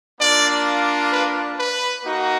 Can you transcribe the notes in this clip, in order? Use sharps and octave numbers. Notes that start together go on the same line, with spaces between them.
A#3 D4 F4 D5
B4
B4
A#3 D#4 F#4